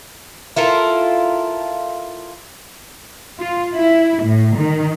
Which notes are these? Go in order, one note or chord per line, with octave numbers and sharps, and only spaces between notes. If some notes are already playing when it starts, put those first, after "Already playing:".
E4 F4 A4 A#4
F4
E4
A2
D#3